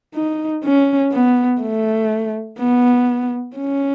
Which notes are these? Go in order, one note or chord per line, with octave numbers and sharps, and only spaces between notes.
D#4
C#4
B3
A3
B3
C#4